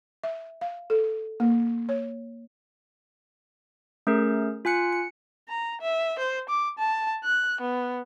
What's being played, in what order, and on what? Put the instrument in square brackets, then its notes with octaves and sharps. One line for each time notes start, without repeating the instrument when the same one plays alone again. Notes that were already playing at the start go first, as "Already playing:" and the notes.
[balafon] E5
F5
A4
A#3
C#5
[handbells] A3 C#4 G#4 A#4
F4 G#5 F#6 C#7
C#7
[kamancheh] A#5
E5
C5
D6
A5
F#6
B3